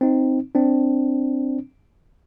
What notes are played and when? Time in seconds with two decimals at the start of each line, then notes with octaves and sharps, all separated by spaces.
0.01 C4 D#4
0.55 C4 D4